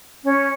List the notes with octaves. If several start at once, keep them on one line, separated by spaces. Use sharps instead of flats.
C#4